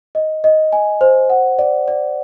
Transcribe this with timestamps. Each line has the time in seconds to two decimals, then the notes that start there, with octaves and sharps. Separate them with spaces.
0.15 D#5
0.44 D#5
0.73 G#5
1.01 C5
1.30 F#5
1.59 D5
1.88 D5